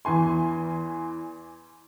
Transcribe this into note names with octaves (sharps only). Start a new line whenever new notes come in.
E2 E3 G#5 C6